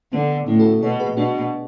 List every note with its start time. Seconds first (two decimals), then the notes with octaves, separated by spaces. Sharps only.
0.13 D3 B3
0.47 A2 C#4 E4
0.59 F#4 A4
0.82 B2 A4 C#5
1.00 G#4 B4
1.17 B2 D4 F#4